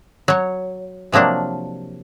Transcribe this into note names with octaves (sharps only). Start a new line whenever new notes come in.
F#3 C#5
C3 F3 F#3 A#3 D4